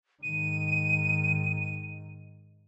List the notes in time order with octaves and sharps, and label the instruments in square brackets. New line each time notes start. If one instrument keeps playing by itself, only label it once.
[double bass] G#2 D#3 [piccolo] D#7